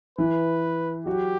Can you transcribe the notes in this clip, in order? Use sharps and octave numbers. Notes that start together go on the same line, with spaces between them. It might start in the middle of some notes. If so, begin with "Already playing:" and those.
E3 E4 B4
F#3 F#4 G4